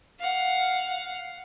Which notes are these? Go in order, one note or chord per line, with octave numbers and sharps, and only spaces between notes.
F5 F#5